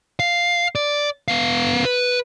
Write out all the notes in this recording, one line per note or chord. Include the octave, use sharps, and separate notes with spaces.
F5
D5
B3 F5
B4